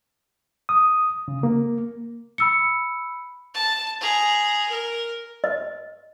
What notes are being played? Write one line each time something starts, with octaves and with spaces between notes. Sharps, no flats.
D#6
C#3
A#3
B5 E6 C#7
A5
G#4 A#5
A#4
D#5